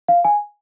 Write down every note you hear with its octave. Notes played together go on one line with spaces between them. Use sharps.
F5
G#5